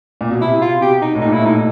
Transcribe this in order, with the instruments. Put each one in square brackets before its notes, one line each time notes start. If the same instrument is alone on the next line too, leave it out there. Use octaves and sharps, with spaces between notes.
[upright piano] A#2
B2
[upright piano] C3 [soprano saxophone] E4
[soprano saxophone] F4
[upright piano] B2 [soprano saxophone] G4
[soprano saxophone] D#4
[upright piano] A2
[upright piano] A#2 [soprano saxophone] D#4
[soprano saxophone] E4
[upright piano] A2 [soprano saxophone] D#4